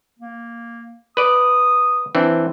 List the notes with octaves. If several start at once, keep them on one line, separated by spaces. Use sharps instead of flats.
A#3
B4 D5 D#6
E3 C4 D4